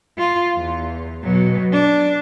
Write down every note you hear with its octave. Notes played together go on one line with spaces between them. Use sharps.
F4
E2
B2 F#3
D4